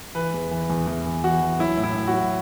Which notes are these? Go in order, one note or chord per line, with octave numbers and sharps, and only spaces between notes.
E3 B4
E2
E3
E2
E2
E3
E3 F#4
E3
F#3 E4
A2
E4
A2
F#4
F#3